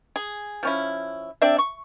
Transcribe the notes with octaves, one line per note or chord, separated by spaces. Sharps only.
G#4
F3 C#4 E4
C4 D4 D5 E5
C#6